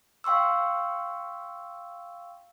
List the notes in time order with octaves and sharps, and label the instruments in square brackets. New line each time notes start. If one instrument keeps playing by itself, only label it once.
[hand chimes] F5 G5 C6 C#6 E6